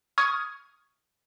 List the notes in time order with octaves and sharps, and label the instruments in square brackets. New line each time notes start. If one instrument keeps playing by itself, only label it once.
[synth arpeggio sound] C#6 D#6 F6 G#6